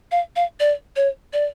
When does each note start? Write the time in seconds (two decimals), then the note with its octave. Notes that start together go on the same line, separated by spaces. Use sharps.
0.12 F5
0.36 F5
0.60 D5
0.96 C#5
1.33 D5